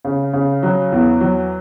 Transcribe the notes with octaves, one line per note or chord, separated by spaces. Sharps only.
C#3
C#3
F#3
E2
F#3